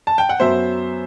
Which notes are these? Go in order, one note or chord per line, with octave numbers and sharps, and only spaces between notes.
A5
G5
F#5
F#2 F#3 B3 C5 E5